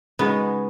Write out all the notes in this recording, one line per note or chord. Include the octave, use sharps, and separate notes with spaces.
C#3 G#3 B3 D#4 F#4